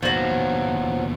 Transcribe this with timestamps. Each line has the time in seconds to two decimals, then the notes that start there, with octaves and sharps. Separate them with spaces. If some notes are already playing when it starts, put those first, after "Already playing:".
0.03 D#2 B2 F3 F#3